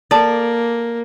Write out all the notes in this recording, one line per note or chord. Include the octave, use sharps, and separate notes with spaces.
A#3 A4 D5 A5